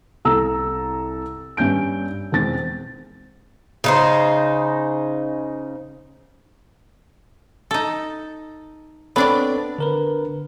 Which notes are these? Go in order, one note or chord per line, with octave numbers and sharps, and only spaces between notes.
C2 A4 A#5 E6
G2 C#4 G6 D7
E1 G#3 C4 A6
C#3 D#4 C5
D#4 A4
B3 C4 D4 A4 C#5 D5
D3 A#4 B4